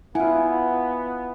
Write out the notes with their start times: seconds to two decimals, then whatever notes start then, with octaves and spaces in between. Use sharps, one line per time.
0.15 B3 E4 F4 F#5 G#5